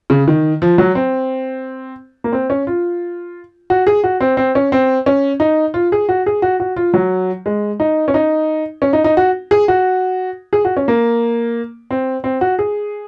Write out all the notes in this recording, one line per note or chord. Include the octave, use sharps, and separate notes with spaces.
C#3
D#3
F3
F#3
C4
A#3
C4
C#4
F4
F#4
G#4
F#4
C4
C4
C#4
C4
C#4
D#4
F4
G#4
F#4
G#4
F#4
F#4
F4
F#3
G#3
D#4
C#4
D#4
C#4
D#4
D#4
F#4
G#4
F#4
G#4
F#4
C#4
A#3
C4
C4
F#4
G#4